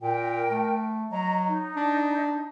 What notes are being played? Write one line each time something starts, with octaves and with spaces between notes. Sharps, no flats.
A#2 A#4 G5
A3
F#3 D#5 A#5
D#4
D4